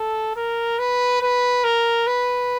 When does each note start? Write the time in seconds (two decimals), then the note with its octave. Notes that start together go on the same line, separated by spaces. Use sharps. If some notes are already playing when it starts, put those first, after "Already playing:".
Already playing: A4
0.36 A#4
0.79 B4
1.21 B4
1.64 A#4
2.07 B4